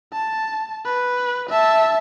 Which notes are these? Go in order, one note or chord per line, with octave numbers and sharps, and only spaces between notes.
A5
B4
E5 A5